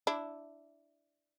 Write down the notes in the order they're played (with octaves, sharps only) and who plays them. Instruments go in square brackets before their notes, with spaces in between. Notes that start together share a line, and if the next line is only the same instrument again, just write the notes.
[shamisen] D4 E4